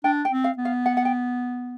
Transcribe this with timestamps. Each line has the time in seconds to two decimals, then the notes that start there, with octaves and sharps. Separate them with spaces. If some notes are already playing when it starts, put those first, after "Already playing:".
0.04 D4 G5
0.25 G5
0.31 C4
0.44 F5
0.58 B3
0.65 F5
0.86 F#5
0.97 F#5
1.05 G5